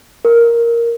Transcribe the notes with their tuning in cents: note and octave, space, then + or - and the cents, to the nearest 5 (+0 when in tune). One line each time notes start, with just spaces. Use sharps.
A#4 +5